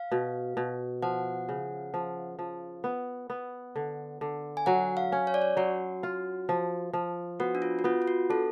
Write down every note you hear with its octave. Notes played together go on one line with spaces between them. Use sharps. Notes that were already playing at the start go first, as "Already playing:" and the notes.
Already playing: F5
B2
B2
F3 F#5
C#3
F3
F3
B3
B3
D3
D3
G#5
F#3 F#5
F5
C#4
C#5
D5
C#5
F#3 F#4
F4
F3
F3
B3 F#4
D4
F4
F#4
B3 F4
F4
F#4
D4 A4